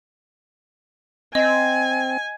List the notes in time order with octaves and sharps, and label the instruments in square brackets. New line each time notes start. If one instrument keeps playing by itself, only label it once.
[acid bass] C4 [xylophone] D#5 [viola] G#5